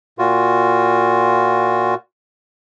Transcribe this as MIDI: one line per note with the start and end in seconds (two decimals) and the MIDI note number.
0.19 1.95 46
0.19 1.95 65
0.19 1.95 66